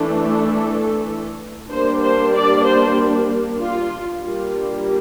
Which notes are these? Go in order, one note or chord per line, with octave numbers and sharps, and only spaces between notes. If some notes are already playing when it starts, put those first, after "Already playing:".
Already playing: E3 A3 D4
A4
G3 A#3 D4 C5
C5
D5
C5
F4
G3 A#3 D4 F4